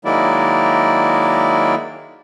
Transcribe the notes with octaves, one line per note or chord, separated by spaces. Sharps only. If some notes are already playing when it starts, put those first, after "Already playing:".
D#3 F#3 G#3 A#3 E4 D5